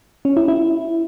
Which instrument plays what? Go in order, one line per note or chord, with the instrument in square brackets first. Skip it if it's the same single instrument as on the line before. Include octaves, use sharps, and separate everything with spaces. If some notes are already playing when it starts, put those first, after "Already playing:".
[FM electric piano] C#4
E4
E4